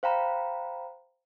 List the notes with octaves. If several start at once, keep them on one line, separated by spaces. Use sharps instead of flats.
C5 F5 G5 A#5 B5